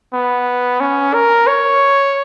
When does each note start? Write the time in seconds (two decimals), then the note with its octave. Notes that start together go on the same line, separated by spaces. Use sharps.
0.13 B3
0.80 C#4
1.14 A#4
1.47 C#5